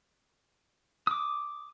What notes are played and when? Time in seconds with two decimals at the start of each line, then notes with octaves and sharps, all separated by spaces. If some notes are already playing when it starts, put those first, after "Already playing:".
1.07 D6 D#6